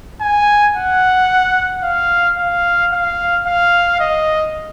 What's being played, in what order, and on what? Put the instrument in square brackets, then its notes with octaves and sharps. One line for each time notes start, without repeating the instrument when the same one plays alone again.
[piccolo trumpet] G#5
F#5
F5
F5
F5
F5
D#5